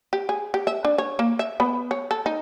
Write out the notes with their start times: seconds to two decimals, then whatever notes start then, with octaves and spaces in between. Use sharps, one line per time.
0.13 G4
0.29 G#4
0.54 G4
0.67 E5
0.85 D4
0.98 C#5
1.19 A#3
1.39 E5
1.60 B3
1.91 C#5
2.11 A4
2.26 D#4